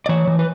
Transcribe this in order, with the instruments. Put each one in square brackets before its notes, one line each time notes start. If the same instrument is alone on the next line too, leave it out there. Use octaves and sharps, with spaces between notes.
[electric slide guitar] D5
E3 C#5
E3
B4